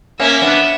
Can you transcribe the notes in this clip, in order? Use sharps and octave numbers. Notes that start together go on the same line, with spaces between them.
A#3 C#4 E5
B3 D4